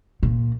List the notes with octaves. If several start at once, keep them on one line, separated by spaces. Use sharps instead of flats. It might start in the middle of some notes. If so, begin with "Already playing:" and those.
A#2